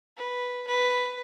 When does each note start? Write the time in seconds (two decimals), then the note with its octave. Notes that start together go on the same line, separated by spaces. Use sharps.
0.17 B4
0.67 B4